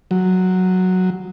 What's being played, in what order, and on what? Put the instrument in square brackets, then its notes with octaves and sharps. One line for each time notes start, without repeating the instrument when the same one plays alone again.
[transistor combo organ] F#3